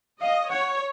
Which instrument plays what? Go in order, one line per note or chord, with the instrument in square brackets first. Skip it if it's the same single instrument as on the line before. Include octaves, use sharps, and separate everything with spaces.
[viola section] D#5 [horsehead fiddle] F5
[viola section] C#5 [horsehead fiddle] F#5